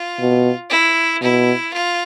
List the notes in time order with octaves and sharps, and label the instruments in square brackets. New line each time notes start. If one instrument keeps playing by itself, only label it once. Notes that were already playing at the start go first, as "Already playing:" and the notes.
Already playing: [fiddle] F4
[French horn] B2
[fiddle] E4
[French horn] B2 [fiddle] E4
[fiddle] F4